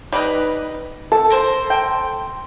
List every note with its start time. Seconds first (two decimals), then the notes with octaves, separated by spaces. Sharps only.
0.13 G3 D#4 B4
1.12 A4 A5
1.30 A#4 C5
1.70 G5